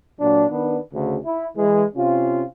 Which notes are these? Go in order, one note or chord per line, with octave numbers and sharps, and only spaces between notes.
A#2 F#3 D4
D#3 B3 D4 B4
D2 C#3
E4
E3 G#3
C3 C#4 F4